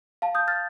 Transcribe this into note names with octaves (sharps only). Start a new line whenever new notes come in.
F5 A5
D#6 G6
F6 A6